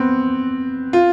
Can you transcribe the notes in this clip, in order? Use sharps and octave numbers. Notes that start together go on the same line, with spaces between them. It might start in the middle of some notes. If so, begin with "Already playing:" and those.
Already playing: B3 C4
F4